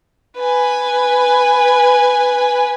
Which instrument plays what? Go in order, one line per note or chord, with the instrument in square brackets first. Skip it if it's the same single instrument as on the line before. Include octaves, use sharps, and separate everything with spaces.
[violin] B4 G#5